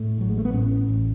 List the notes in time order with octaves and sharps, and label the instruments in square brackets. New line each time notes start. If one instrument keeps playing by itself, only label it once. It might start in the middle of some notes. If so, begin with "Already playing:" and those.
Already playing: [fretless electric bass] A2 A3
A1 F#3
G#3
A3
B3
A2 C#4
A1